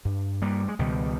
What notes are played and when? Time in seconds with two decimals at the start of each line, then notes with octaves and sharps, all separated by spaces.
0.05 G2
0.42 G3 A#3
0.68 G#3
0.79 C#2 B2 D#3 G3